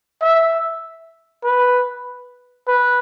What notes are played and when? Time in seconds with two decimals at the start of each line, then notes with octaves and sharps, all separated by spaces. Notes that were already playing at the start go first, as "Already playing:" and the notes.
0.22 E5
1.44 B4
2.68 B4